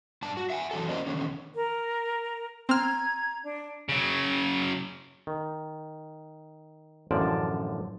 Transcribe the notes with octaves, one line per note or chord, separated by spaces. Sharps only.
G2 D4 A5
F#4
E5 F#5 G#5
E3 F#3 A4
A#3 C#4 A#4 C5 D5 D#5
E2 D3 D#3 C#4
A#4
C4 A#5 F6 G#6
D4
C#3 F#3
D#3
A1 F#2 D3 F3 D5 A5